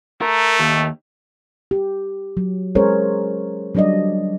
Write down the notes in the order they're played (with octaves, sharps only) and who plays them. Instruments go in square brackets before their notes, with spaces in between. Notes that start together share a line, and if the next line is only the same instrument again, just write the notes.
[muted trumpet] A3 [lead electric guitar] A#4
[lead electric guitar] D#2
[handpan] G4
F#3
G#3 C#4 G#4 A#4 C5 C#5
F#3 G3 D4 D5 D#5